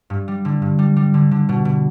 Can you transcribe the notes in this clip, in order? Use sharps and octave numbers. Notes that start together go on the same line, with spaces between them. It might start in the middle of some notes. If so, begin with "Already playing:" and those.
G2
G3
D3
G2
G3
G3
D3
D3
B2
B2